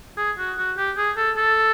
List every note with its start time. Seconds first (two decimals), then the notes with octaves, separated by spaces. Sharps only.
0.17 G#4
0.38 F#4
0.58 F#4
0.77 G4
0.98 G#4
1.17 A4
1.37 A4